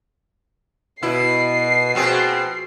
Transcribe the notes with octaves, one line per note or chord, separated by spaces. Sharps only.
B2 E4 C7
B2 F3 A#3 C4 F#4 G#4